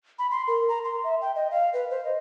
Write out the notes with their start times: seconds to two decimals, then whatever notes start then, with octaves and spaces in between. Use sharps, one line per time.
0.19 B5
0.31 C6
0.48 A#4
0.69 A#5
0.84 C6
1.04 E5
1.21 G5
1.35 D#5
1.51 F5
1.73 B4
1.91 C5
2.05 D#5